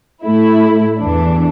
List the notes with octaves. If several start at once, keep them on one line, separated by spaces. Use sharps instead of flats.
A2 A3 E4
E2 E3 D4